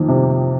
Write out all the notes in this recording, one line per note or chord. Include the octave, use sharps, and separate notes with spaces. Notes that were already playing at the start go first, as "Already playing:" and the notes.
Already playing: F2 D#3 A#3
C3